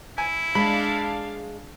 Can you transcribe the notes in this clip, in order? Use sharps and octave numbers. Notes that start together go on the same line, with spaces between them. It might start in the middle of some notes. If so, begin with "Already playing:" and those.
E4 G#5
G#3 D4 F5 B5